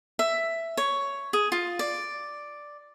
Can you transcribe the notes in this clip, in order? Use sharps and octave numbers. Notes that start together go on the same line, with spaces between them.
E5
C#5
G#4
F4
D5